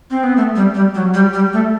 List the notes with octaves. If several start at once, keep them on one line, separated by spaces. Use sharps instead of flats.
C4
B3
A3
G3
G3
F#3
G3
G3
A3